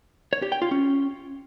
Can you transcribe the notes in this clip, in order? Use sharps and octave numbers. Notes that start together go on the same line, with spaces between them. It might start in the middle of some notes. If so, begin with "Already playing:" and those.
C#5
G4
G5
F4
C#4